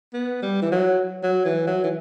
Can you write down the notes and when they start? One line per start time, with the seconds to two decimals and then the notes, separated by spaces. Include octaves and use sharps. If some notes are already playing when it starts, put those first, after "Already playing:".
0.14 B3
0.42 G3
0.62 E3
0.72 F#3
1.23 F#3
1.45 E3
1.67 F#3
1.84 E3